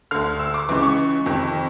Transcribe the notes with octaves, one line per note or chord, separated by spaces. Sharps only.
D2 D3 F6
E6
D6
C#2 C#3 E3 D6
C#6
F2 C3 D#3